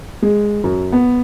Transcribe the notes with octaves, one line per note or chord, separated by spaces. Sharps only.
G#3
F#2
B3